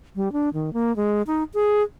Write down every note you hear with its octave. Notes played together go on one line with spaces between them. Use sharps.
G3
D4
D#3
A#3
G#3
D#4
G#4